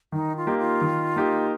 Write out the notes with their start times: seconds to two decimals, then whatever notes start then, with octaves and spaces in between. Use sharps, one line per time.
0.12 D#3 D#4
0.36 F4
0.47 A#3 D#4 G4
0.59 F4
0.81 D#3
1.16 A#3 D#4 G4